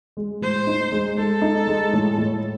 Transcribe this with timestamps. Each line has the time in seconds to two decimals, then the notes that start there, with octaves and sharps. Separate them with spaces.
0.17 G#3
0.41 A2 C5
0.67 D#4
0.92 G#3
1.18 G#3 A4
1.42 D#4
1.67 G#3
1.93 A2
2.18 A2